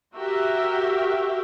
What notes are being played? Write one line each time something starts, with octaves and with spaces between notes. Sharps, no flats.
F#4 G4 A#4 E5